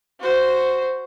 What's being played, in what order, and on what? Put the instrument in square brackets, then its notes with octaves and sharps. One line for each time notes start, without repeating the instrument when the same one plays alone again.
[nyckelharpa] F#4 C5